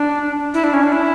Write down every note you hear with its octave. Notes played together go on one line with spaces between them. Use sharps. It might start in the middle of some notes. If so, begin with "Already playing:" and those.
Already playing: D4
E4
D4
C#4
D4
E4